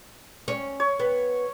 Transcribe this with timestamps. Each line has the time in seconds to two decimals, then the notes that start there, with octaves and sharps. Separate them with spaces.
0.48 C#4
0.80 C#5
1.00 B3